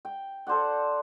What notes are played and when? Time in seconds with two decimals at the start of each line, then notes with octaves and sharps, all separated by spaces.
0.05 G5
0.47 A4 C5 D5 F#5